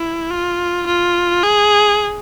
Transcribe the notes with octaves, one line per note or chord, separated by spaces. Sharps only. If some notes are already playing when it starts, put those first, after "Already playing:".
Already playing: E4
F4
F4
G#4